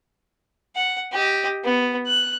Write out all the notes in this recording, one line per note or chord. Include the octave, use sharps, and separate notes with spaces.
F#5
G4 D#5
B3
F#6